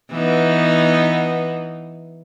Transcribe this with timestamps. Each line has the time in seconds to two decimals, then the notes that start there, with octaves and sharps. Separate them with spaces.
0.11 E3 B3 D#4